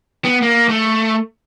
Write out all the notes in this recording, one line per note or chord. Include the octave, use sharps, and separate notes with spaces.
B3
A#3
A3